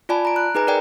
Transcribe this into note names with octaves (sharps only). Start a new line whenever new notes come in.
F4 D5 G#5 A5 B5
A#5 D7
F#6
D#4 G#4 B4 G#5 A#5
A#4 D5 G5 G#5